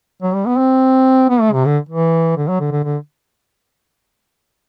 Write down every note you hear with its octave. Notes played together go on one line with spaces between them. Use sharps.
F#3
G3
B3
C4
B3
A3
C3
D3
E3
D3
F#3
D3
D3
D3